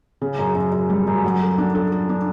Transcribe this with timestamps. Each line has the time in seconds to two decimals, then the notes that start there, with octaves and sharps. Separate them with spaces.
0.22 C#3
0.39 F#2
0.55 F#2
0.72 F#2
0.90 G3
1.07 F#2
1.24 F#3
1.41 A4
1.58 D4
1.75 A4
1.92 A4
2.09 D4